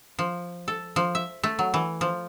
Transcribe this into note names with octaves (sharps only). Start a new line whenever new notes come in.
F3
A4
F3
E5
A3
F#3
E3
F3